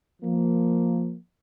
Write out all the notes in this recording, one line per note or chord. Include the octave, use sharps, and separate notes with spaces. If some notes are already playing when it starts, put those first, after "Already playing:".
F3 A#3